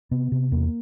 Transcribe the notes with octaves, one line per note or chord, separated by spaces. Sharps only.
C3 B3
C3
E2 A#3